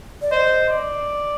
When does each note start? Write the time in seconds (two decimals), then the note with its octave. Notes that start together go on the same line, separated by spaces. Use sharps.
0.22 D5
0.31 C5 D#5
0.70 D5